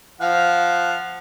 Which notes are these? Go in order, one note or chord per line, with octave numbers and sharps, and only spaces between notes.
F3 F5 F#5